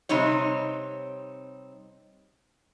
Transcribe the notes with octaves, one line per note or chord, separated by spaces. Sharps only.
C3 G3 C4 D#4 C#5